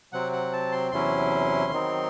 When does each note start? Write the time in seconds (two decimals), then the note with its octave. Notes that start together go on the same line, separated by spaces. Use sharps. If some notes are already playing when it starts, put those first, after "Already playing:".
0.13 C3 F#3 C4 F#5
0.32 F#5
0.53 A5
0.72 C6
0.92 E2 C3 F#3 C#4 E4 C6
1.72 D#3 F#3 C4 D#4